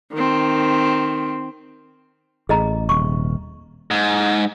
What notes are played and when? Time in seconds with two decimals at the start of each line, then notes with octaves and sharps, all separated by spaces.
0.13 D#3 C4
2.49 A1 G#4 D#5 A#5
2.89 D#1 C3 C#6
3.91 G#2